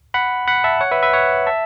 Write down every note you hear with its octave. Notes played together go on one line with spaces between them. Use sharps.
F#5 B5
F#5 B5
E5 A5
C#5 F#5
B4 E5
B4 E5
C#5 F#5
E5 A5